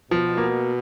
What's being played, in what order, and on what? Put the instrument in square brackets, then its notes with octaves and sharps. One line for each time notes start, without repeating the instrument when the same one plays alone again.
[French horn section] B2 [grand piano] F3
[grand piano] A#3